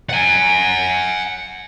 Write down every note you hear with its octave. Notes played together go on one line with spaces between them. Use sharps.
F#5 G#5